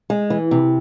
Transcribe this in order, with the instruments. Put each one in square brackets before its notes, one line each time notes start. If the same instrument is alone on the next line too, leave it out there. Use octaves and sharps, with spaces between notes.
[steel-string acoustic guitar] G#3
E3
C3